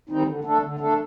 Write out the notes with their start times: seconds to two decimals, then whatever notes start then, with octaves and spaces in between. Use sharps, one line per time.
0.09 D#3 G3 C4 D#4
0.26 D3
0.44 A3 D4 A4
0.62 D3
0.79 A3 D4 A4